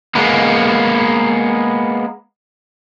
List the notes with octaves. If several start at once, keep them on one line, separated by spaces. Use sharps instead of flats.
G#3 A#3 B3